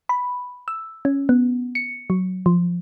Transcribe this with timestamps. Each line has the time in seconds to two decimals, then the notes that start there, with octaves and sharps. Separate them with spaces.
0.09 B5
0.68 E6
1.05 C#4
1.29 B3
1.75 C#7
2.10 F#3
2.46 F3